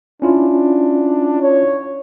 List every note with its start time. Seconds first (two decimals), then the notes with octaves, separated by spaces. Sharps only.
0.22 C#4 D4 E4 F4
1.42 C#5